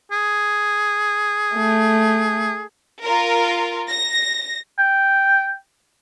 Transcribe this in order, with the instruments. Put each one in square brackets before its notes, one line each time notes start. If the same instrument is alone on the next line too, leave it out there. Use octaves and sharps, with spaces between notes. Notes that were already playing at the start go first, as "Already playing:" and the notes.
[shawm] G#4
[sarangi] A3
[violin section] F4 A#4
A#6
[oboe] G5